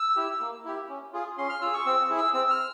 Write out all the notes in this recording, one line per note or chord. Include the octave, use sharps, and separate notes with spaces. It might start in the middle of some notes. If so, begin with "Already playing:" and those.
Already playing: E6
E4 G4
A#3
E4 G4
C#4
F4 G#4
C#4 C6
F6
F4 G#4 E6
C#6
C4 E6
E4 G#4
E6
C4 E6
F6